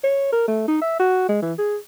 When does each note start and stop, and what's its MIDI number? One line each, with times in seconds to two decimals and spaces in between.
0.04 0.31 73
0.32 0.45 70
0.48 0.66 57
0.68 0.78 63
0.81 0.98 76
1.00 1.26 66
1.29 1.41 56
1.42 1.53 52
1.58 1.77 68